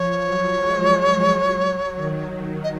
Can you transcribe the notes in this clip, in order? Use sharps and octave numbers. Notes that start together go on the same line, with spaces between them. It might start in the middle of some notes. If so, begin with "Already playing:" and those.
Already playing: F3 C#5
F#3
G#3
F#3
D#3
D#5